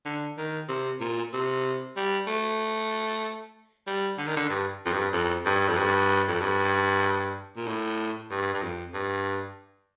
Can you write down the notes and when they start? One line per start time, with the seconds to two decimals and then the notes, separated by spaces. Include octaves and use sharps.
0.05 D3
0.37 D#3
0.69 C3
1.00 A#2
1.33 C3
1.96 G3
2.27 A3
3.87 G3
4.18 D3
4.26 D#3
4.36 D3
4.50 G2
4.86 F2
4.92 G2
5.13 F2
5.46 G2
5.68 F2
5.77 G2
6.28 F2
6.41 G2
7.56 A#2
7.67 A2
8.31 G2
8.54 G2
8.62 F2
8.94 G2